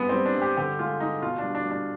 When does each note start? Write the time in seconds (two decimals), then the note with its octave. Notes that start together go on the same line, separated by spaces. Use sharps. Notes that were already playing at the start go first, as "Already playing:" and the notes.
Already playing: G2 G#3 B3
0.09 G3 C4
0.25 D4
0.37 G2 G4
0.57 D3 G4
0.79 G#3 F4
1.00 G#3 D#4
1.22 B2 F4
1.38 D4
1.43 G3
1.55 D4
1.65 G3
1.71 D4